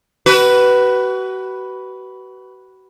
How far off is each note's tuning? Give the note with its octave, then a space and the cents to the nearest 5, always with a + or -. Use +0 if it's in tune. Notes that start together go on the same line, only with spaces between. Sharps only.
F#4 +35 B4 +0